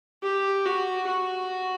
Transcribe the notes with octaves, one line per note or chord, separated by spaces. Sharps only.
G4
F#4
F#4